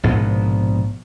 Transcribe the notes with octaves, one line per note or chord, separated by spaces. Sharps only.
A#1 G#2 B2 B3